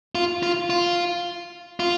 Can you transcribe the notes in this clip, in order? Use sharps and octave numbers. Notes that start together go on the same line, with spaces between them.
F4
F4
F4
F4